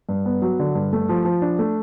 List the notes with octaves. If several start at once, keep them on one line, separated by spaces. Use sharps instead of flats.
G2
B3
F#3
D3
G2
A3
F3
F3
D4
A3